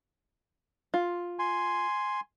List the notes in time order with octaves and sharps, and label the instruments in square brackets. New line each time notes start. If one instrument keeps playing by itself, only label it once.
[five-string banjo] F4
[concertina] G#5 C6